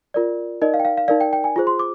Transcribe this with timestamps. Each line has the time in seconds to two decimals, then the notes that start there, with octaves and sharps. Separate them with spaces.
0.14 F4 A#4 D5
0.61 D#4 A#4 D5 D#5
0.74 F5
0.80 G5
0.85 F5
0.97 F5
1.08 D#4 A#4 D5 F5
1.21 G5
1.33 G5
1.44 G#5
1.56 F4 G#4 C5
1.67 C6
1.79 D6